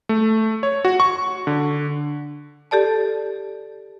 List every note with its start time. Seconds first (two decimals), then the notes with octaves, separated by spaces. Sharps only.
0.09 A3
0.63 C#5
0.85 F#4
1.00 C#6
1.47 D3
2.71 G4 A4 D5 A5